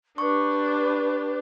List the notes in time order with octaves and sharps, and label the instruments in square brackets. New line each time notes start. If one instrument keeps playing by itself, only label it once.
[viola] D4 G4 [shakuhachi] B4 [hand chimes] C#6